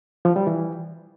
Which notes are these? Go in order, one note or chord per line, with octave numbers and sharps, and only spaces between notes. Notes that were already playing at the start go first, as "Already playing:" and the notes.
F3
G3
E3